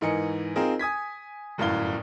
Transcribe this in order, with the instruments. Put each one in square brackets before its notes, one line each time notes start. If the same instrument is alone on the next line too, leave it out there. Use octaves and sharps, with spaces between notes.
[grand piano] G#2 E3 A#4 D#5 G#5 C#7
C4 D#4 F4 G#4 A#4
G#5 D#6 G#6 B6
G1 F#2 A2 F5 G7